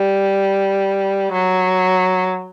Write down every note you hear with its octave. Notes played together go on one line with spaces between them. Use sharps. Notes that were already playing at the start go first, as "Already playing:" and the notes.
Already playing: G3
F#3